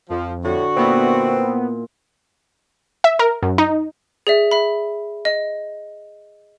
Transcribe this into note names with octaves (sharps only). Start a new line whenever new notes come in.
F2 F3
A2 D3 F#4
A#2 B3 C4 E4
E5
A#4
F#2
D#4
G#4 D5 E5
E5 B5
D#5